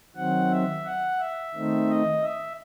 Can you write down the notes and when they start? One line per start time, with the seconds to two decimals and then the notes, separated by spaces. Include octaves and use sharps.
0.16 D#3 F#3 C4 F#5
0.51 E5
0.85 F#5
1.19 E5
1.55 D#3 A3 C4 D#4
1.89 D#5
2.23 E5